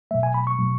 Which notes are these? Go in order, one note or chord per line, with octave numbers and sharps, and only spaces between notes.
B2 F#3 A3 E5
G#5
B5
C#6
B2 F#3 A3